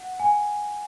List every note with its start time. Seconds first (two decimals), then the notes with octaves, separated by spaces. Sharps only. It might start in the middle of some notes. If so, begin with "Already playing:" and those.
Already playing: F#5
0.20 G#5